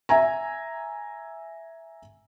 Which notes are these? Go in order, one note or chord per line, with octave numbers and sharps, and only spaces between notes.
E5 G#5 A#5